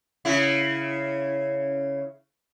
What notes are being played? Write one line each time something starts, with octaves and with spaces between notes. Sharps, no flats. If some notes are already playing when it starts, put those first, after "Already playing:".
C#3 E4